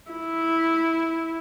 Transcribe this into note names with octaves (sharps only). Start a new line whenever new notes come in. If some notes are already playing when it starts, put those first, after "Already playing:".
E4